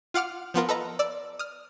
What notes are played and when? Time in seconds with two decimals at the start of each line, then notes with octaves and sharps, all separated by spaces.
0.14 F4 F5 F#5 D6 F6
0.54 F3 B3 F4 A#4
0.69 A4 B4 D#5 A#5
0.99 D5 E6
1.39 D#6 F6